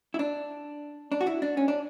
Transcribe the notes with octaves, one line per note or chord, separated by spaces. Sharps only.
E4
D4
D4
F#4
E4
D4
C#4
D4